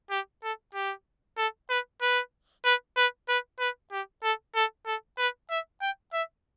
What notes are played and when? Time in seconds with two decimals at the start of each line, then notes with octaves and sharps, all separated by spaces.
0.10 G4
0.43 A4
0.74 G4
1.38 A4
1.70 B4
2.02 B4
2.65 B4
2.97 B4
3.28 B4
3.59 B4
3.92 G4
4.23 A4
4.55 A4
4.86 A4
5.18 B4
5.50 E5
5.81 G5
6.13 E5